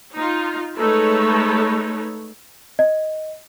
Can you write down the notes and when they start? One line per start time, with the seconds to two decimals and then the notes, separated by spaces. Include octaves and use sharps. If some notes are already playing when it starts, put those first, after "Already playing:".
0.16 D#4 F4
0.78 G#3 A3 D#4 A4 B4 C#5
2.79 D#5